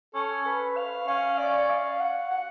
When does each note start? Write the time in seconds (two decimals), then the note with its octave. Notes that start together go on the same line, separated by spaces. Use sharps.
0.14 C#4 A4
0.46 B4
0.77 F5
1.07 C#4 F5
1.38 D5
1.70 F5
2.00 F#5
2.31 F#5